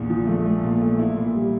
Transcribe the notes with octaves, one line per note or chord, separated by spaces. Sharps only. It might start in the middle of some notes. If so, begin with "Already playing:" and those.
Already playing: A#1 E2
F3
A3
A3
A#2
A3
E4
A#2
G3